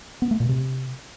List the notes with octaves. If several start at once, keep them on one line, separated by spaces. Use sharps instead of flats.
B3
A3
A#2
C3